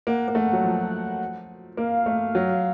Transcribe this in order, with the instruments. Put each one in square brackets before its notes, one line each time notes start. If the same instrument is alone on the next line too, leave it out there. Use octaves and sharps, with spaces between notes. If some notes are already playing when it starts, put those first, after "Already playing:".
[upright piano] A#3 [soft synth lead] F#5
[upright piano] A#3
A3
F#3
F3
[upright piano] A#3 [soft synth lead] F5
[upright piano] A3
F#3